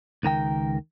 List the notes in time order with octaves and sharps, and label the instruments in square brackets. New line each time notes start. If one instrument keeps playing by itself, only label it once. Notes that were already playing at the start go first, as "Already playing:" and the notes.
[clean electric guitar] C#2 D#3 A#4 G5